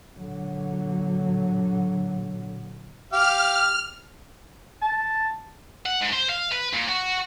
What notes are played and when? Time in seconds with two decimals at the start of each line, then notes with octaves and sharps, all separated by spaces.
0.17 A#2 D3 F#3
3.13 G4 F5 F6
4.82 A5
5.86 F#5
6.01 G#2
6.13 C5
6.30 F5
6.52 B4
6.74 A#2
6.89 F#4